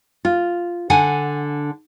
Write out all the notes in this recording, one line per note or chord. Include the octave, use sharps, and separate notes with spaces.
F4
D3 F#5 G#5